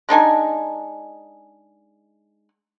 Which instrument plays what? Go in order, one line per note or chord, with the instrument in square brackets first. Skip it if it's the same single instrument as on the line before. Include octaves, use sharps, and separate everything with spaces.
[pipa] G#3 D4 D#4 G#5